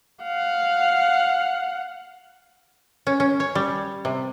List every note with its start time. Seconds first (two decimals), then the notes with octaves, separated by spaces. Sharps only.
0.23 F5 F#5
3.07 C#4
3.20 C#4
3.40 C#5
3.55 G3
4.05 C3